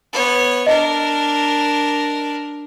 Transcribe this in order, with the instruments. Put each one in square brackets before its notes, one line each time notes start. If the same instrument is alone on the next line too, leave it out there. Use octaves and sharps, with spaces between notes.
[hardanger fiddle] B3 C#5
[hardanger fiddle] D4 A#4 [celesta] D#5